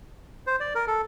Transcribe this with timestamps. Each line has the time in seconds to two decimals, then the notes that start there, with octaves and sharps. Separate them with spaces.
0.47 C5
0.60 D5
0.75 A#4
0.88 A4